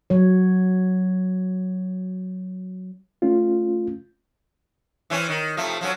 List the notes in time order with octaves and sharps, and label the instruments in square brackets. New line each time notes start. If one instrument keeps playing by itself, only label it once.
[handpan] F#3 C#5
[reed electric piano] A3 C#4 F4
[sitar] E3 C4 C#4
D#3
C3 F3 A3
F3 F#3 C#4